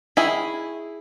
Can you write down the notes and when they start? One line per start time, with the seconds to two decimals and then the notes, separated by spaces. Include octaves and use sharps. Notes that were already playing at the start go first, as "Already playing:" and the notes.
0.17 D#3 E4 G#4